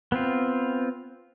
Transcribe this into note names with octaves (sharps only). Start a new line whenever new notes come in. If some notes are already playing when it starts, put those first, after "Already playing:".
B3 C4 F4